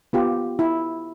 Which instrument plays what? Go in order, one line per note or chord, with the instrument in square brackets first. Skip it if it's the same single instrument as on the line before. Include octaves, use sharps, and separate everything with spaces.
[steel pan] B3 F4 G4
E4